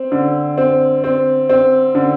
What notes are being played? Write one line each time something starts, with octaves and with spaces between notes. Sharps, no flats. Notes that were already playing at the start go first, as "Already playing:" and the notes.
Already playing: C4
D3
C4
C4
C4
D3